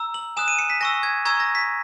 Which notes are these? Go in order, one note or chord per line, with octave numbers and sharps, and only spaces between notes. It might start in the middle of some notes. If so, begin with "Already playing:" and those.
Already playing: A#5 E6
F#7
G#5 D#6 F#6 E7
D#7
C#7
B6
G#5 C#6 E6 A#6
G#6
A#5 C#6 E6 G#6
A#6
B6